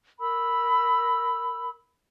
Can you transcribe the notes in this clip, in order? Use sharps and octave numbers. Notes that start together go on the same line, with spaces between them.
A#4 B5 E6